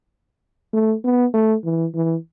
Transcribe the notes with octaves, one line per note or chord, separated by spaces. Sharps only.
A3
B3
A3
E3
E3